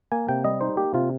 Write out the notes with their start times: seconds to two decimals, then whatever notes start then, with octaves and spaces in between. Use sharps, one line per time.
0.12 A#3 G#5
0.29 C3 G5
0.45 G3 D#5
0.61 D#4 C5
0.77 A#3 G4
0.94 C3 F4